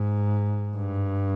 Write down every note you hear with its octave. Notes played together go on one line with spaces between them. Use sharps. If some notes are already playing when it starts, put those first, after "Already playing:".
Already playing: G#2
G2